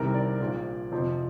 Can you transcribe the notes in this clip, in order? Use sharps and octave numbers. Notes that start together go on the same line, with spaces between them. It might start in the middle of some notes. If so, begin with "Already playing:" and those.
Already playing: C2 C3 D#3 G3 A#4
D5
A#1 A#2 F3
F2 C3 F3